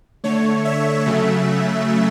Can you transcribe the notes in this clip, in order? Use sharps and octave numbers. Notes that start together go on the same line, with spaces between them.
D3 A3 C#5
E5
C#3 F#3 A3